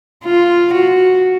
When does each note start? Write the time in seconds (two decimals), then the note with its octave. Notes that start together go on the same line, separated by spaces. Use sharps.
0.25 F4
0.74 F#4